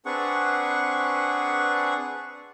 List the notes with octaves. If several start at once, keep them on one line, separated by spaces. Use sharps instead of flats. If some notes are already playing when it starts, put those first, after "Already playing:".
C4 D4 G#4 B4 F#5 C#6